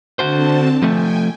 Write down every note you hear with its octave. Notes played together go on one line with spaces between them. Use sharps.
D3 C4 F#4 C5 A5
F3 A3 G5 G#5